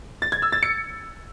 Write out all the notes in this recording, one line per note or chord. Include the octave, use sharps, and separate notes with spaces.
A6
G#6
E6
A6
C#7